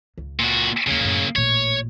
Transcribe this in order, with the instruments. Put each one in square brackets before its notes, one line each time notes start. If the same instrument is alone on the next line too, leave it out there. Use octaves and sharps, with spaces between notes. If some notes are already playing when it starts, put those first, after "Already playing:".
[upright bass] C#2
[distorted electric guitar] A#2 F#4
[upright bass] D#2 G#3 [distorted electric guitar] C#3 A#3
[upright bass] F#2 A2
[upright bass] A1 A#2 [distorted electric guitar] C#5